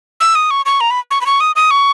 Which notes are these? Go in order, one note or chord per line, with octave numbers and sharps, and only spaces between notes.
E6
D#6
C#6
C#6
A#5
B5
C#6
B5
C#6
D#6
D#6
C#6